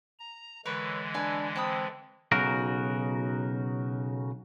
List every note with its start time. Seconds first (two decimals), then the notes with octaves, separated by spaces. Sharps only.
0.19 A#5
0.65 D3 E3 G#3 A#4 B4 C#5
1.14 D4 B4 G#5
1.56 C4 A5 B5 D#6
2.32 B1 C#3 D#4 F#4 A#4